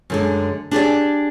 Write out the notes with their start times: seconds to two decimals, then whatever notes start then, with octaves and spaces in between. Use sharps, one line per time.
0.10 F#2 D3 G#3
0.71 D4 G4 G#4 D5